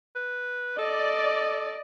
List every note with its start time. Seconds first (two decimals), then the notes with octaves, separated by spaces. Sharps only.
0.15 B4
0.79 A4 D5 D#5